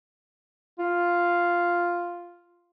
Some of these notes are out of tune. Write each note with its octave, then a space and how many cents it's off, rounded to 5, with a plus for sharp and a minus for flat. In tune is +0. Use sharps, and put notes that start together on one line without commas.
F4 +0